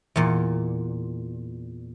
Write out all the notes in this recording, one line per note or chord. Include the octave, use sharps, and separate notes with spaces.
E2 A#2